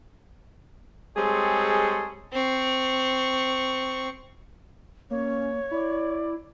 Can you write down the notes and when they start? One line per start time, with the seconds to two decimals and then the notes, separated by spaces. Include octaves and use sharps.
1.17 G3 G#3 C4 G#4 A4 C#5
2.33 C4 C#6
5.11 A#3 C#4 C#5
5.71 E4 D5